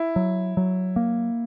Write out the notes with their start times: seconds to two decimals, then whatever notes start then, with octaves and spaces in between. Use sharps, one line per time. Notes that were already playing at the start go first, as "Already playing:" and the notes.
Already playing: E4
0.16 F#3
0.57 F#3
0.96 A#3